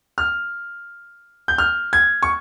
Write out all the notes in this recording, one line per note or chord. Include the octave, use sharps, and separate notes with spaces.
F6
G6
F6
G#6
C#6